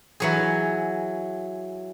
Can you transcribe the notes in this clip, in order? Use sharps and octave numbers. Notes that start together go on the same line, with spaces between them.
E3 F#3 G#4